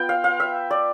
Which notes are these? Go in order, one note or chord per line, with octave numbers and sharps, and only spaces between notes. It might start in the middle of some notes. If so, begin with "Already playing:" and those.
Already playing: B3 F4 G5
F5
F5
E5
D5